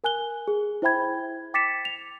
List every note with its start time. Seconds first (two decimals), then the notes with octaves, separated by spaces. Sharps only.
0.04 A#4 G#5 F#6 G7
0.48 G#4
0.82 E4 C5 E5 G5 B5 G#6
1.54 G5 D6 A6 B6 C#7 E7
1.85 F7